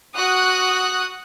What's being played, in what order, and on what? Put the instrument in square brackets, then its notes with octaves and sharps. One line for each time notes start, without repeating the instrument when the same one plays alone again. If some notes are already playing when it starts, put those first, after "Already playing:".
[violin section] F#4 D#6 F#6